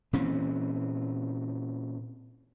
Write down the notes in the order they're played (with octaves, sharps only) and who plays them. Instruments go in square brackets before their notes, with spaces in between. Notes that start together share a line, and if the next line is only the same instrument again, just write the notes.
[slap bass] A#2 E3 C4 C#4